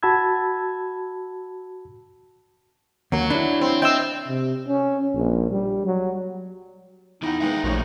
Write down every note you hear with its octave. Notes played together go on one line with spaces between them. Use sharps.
F#4 A5 B5 E6 G#6
D#2 F#3 A#3
D4 E4 C#5 D5 B5
C4
C4 D#5 E5 G5 E6
C3
C#4
A#1
G3
F#3
E3 B3 D#4 E4 F#5 G5 G6
D#2 G#3 B3 E5 F5 G5
A#1 A#2 A3 C#4 F#4 C5 C#5